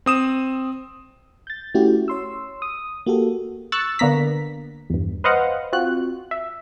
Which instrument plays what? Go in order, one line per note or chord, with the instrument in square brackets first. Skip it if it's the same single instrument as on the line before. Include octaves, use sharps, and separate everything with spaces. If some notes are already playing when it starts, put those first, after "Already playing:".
[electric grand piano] C4 D#6 E7
[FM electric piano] G6 A6
A3 C#4 E4 F#4 G4
C#5 C6 E6
D#6
A#3 F#4 G4 A4
[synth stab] C#6 E6 F#6 A6
D3 A#3 B3 A#5 B6
E2 G2
B4 C5 D#5 F5 F#5
C4 F4 F#4 F#6
E5